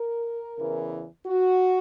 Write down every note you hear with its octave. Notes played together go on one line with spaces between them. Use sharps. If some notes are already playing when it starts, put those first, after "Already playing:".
Already playing: A#4
E2 C#3 E3
F#4